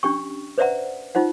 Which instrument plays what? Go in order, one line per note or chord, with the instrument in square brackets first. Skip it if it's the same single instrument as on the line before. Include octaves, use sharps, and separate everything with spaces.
[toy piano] C#4 D4 G4 G5 C#6
B4 C5 D5 E5 F#5 A#5
D#4 F4 C5 F#5